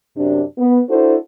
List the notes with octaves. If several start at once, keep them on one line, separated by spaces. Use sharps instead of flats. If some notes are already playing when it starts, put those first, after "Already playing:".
F#2 C3 D4
B3
D4 E4 F#4 A4 C5